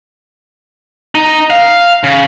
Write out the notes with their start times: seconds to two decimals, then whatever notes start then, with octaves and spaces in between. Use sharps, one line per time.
1.15 D#4
1.50 F5
2.04 C#3